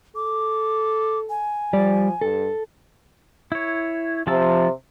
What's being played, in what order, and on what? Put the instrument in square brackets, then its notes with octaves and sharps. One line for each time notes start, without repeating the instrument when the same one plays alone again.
[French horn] A4 [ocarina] D6
[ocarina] G#5
[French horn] F3 [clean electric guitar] G3 D5
[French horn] G2 [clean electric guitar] A4
[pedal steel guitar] E4 C#5
[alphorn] C3 [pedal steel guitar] F3 A5 E6